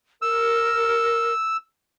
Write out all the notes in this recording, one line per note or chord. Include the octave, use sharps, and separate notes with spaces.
A#4 E6